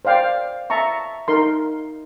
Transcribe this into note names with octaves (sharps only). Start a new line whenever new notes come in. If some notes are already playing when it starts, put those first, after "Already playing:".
C5 D5 F5 G5
E5 A5 A#5 C#6
D#4 A#4 C6